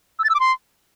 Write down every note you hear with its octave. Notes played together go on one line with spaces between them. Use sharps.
E6
A6
E6
D6
C6